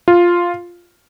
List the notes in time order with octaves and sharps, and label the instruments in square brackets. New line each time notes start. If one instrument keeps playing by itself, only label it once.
[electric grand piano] F4